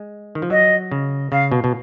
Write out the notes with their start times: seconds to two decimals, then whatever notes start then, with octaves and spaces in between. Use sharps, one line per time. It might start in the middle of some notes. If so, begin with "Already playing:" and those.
Already playing: G#3
0.35 D#3
0.42 F3
0.50 F#3 D#5
0.91 C#3
1.32 C#3 F5
1.52 B2
1.64 B2